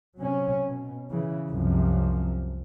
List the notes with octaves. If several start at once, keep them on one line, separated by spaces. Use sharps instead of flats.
C3 F#3 C#4
B2
C#3 E3
C2 F#2 C3 F3